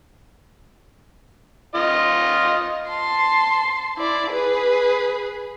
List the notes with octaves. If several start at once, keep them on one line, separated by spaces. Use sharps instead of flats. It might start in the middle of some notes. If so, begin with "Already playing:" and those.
F4 D#5
A5 C6
E4 D5
G#4 B4